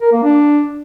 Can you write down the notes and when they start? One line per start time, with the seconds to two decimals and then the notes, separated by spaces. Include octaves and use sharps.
0.02 A#4
0.13 A#3
0.23 D4